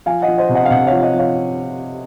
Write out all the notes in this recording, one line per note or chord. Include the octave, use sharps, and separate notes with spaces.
F3 F5 G#5
D#5 F#5
F3
C5 D#5
C3
D#5 F#5
F5
C3 D#5 F#5
F3 C#5 F5
D#5 F#5
F3 C#5 F5